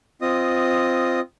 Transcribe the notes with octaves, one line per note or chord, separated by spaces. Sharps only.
C4 F4 D#5 D#6